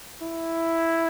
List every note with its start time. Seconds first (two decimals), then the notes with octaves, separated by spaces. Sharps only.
0.22 E4